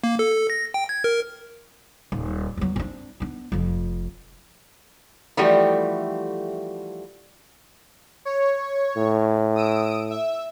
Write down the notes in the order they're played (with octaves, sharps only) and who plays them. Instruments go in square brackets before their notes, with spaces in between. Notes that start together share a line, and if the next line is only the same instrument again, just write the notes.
[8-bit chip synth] A#3
A4
A4
A#6
G5
G#6
A#4
[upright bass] D#1
E2 F#3
C4 D4
B3 D4
F1 F2
[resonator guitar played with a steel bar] E3 F3 G3 A3 F#4 G4
[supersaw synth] C#5
[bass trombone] A2
[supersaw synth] D#6 E6 D7
E5